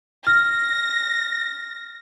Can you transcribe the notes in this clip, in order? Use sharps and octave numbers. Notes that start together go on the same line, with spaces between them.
F6 A#6